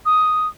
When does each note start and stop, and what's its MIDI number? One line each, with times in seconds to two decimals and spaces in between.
0.05 0.48 87